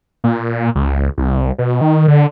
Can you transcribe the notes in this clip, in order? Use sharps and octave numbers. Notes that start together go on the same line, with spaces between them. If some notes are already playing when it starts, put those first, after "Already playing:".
A#2
C#2
C2
B2
D#3
D3